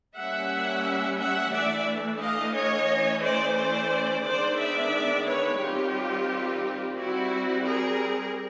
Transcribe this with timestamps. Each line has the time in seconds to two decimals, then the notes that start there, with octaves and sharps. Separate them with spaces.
0.17 G3 A#3 C#4 E5 F#5
1.19 E5 F#5
1.52 E3 A3 D4 D5 E5
2.20 D#5 F5
2.54 C#5 D#5
2.88 E3 A3 C#4
3.22 C5 D5
3.57 C5 D5
4.24 D#3 G#3 B3 D4 C5 D5
4.58 D5 E5
5.26 B4 C#5
5.60 D#3 G3 C4 F4 G4
6.96 G3 C4 E4 F#4
7.64 G#4 A#4